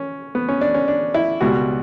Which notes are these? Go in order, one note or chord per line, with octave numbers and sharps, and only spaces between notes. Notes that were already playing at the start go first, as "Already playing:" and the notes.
Already playing: C#4
B3
C#4
D4
C#4
D4
E4
C#2 B2 G3 F#4